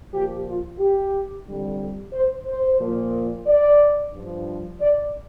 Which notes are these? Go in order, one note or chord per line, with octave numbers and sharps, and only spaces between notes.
A#2 F3 G4
F4
G4
F2 D3 G3
C5
C5
A#2 F3
D5
G2 F3
D5